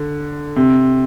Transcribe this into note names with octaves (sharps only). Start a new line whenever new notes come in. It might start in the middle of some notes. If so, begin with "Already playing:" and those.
Already playing: D3
C3